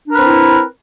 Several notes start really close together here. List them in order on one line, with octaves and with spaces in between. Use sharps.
D4 A#4 B4 C4 E4